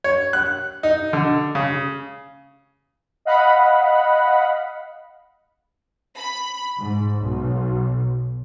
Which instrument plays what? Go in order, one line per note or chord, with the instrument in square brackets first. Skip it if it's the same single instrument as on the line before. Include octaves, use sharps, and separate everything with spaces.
[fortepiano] C#5
F#6
D#4
D3
C#3
[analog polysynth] D#5 F5 F#5 B5
[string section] B5
G#2
B1